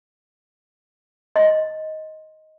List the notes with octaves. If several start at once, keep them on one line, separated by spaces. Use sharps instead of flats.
D#5 C6